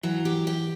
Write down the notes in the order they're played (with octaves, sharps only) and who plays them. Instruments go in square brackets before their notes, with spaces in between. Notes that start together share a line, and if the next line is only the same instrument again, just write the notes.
[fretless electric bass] E3 [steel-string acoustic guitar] F#3
[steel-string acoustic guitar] G4
G4